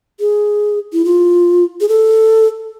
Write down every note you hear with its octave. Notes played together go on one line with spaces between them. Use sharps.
G#4
E4
F4
G#4
A4